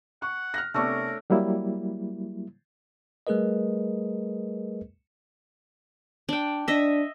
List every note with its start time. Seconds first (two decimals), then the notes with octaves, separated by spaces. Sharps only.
0.22 F#5 C#6
0.54 F6 F#6 A#6
0.74 C3 A3 B3 D4 A#4 C#5 C#6
1.30 F#3 G3 A#3 E4
3.27 G3 A3 G#4 A#4 B4 D#5
6.29 D4 G5
6.68 D4 D#5 E5